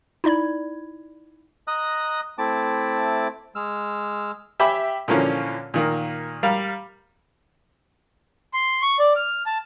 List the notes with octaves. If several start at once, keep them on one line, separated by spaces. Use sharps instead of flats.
D#4 E4 D5 B5 G#6
D#5 A#5 D#6 F#6
A3 C4 E4 A5 D6
G#3 E6 F6
G4 E5 G5 G#5 B5 D6
A#2 D3 E3 F3 A#3 C#4
A#2 D#3 A#3
G3 A#4 F5
C6
C#6
D5
F6
A5